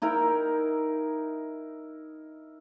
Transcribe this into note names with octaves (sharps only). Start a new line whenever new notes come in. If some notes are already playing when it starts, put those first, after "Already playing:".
D#4 E4 A#4 G5